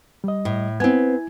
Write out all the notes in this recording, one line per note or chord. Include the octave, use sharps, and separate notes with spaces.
G3 D#5
A2
B3 C4 E4 G#5 G#6